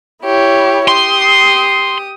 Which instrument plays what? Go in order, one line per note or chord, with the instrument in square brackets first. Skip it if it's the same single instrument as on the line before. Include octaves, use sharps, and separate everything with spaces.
[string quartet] E4 G4 C#5
[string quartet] G4 D#6 [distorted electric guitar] C6